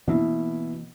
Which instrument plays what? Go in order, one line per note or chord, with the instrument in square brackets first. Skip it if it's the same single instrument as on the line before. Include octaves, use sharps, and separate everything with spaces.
[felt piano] B2 E4 [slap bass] E3 A#3 C4